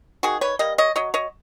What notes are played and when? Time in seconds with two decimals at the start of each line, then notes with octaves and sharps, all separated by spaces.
0.23 D#3 F#4 G#4
0.41 B4 C#5
0.59 G3 A#3 D#5
0.78 C#5 D#5
0.96 F#3 C#5 D#5
1.14 C#5 D#5